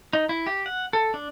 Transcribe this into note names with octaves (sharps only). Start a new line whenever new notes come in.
D#4
E4
G4
F#5
A4
D4